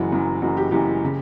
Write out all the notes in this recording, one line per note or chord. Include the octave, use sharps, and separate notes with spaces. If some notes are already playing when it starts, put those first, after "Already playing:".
Already playing: F#1 F#2 E3 F#4
F#1 F#2 E3
F#1 F#2 E3 F#4
G4
F#1 F#2 E3 G4
C#3